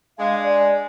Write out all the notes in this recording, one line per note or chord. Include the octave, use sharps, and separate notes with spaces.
G#3 D4 F5
D5